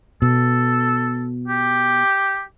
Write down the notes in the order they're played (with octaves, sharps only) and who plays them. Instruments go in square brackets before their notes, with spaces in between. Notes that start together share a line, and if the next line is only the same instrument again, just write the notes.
[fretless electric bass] B2 [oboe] A4
[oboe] G4